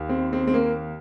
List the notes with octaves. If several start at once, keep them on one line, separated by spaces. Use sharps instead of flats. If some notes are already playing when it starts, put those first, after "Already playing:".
Already playing: D#2
C4
C4
C4
A#3